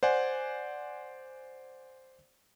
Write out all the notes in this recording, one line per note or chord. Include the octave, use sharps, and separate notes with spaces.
C5 D5 F#5 G#5